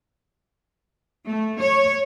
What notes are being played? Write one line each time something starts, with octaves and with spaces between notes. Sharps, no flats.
A3
C#5